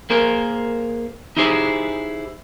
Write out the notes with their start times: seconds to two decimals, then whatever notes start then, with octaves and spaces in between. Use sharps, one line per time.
0.10 A#3 G#4 A#4 C5
1.37 D#4 E4 G4 G#4 C5